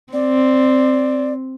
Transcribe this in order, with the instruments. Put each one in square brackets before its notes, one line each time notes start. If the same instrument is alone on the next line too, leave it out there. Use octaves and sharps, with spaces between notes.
[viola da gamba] C4 [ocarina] D5